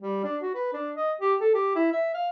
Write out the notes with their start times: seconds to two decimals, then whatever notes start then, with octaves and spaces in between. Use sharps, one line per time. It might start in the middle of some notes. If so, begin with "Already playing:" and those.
0.01 G3
0.24 D4
0.42 F#4
0.55 B4
0.73 D4
0.97 D#5
1.21 G4
1.41 A4
1.55 G4
1.76 E4
1.92 E5
2.14 F5